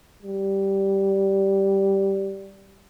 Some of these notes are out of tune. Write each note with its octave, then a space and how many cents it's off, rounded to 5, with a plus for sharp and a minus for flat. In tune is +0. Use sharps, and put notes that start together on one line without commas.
G3 -5